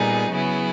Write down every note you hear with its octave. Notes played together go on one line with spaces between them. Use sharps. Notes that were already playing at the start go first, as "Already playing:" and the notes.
Already playing: A#2 G3 B3 D#4 G#4
C#3 F#3 B3 E4 G#4